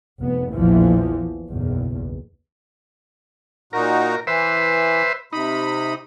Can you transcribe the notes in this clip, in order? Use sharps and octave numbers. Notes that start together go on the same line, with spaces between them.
F1 B3
A#1 E2 A#2 E3 F3
F#1 B1 E2
A#2 D#4 F#4 A#4
E3 B4 C5 E5
C3 D#4 B5